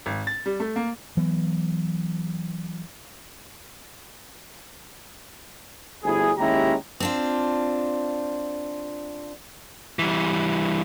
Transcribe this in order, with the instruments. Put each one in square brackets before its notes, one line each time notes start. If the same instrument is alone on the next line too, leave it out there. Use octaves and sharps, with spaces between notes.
[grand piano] G#1
A6
G3
A3
A#3
[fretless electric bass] E3 F#3 B3
[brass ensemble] G1 D2 E4 G#4
D#2 G#3 C#4 E4 G4 A#5
[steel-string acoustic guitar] C4 D4 F4
[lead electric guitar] E3 G3